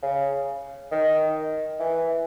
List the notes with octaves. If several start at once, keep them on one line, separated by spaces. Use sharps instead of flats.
C#3
D#3
E3